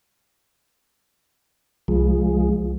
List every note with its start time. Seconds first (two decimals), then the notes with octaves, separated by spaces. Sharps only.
1.88 C2 F3 G#3